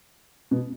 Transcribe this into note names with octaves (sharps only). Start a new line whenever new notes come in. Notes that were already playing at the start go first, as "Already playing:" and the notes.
B2